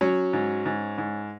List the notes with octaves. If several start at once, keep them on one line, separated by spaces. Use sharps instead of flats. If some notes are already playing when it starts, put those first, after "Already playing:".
F#3 C#4
G#2
G#2
G#2